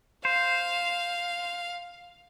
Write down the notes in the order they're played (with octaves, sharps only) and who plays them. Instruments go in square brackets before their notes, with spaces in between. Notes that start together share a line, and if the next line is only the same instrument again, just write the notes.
[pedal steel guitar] C5 [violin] F5